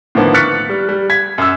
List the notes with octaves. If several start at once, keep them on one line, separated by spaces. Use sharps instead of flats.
A2 D3 D#3 F3 A#3 B3
C#6 F6 F#6 A6 B6 C#7
G3
G3
G#6 B6
F#2 E6